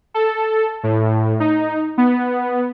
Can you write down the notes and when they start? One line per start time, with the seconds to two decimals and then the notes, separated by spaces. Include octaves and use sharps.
0.14 A4
0.83 A2
1.40 D#4
1.98 B3